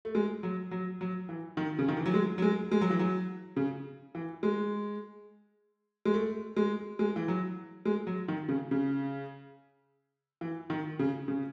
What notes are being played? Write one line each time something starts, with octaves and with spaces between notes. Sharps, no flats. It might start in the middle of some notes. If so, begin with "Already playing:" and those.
A3
G#3
F#3
F#3
F#3
E3
D#3
C#3
D#3
E3
F#3
G#3
F#3
G#3
G#3
F#3
E3
F#3
C#3
E3
G#3
G#3
A3
G#3
G#3
E3
F#3
G#3
F#3
D#3
C#3
C#3
E3
D#3
C#3
C#3